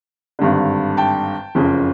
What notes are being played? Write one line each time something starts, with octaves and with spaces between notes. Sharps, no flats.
G#1 G2 D3
G5 A5
F#1 F2 C#3